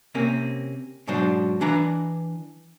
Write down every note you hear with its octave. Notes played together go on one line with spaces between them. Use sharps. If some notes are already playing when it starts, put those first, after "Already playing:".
C3 A#3 C4 C#4
G#2 B2 F#3 D4 C5
E3 D4 B4 A#5